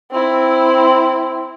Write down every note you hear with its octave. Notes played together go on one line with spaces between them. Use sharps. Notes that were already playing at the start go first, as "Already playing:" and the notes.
C4 E4